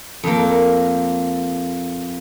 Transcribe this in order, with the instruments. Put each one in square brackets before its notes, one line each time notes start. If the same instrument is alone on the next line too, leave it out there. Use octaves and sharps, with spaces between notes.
[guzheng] F2 A#3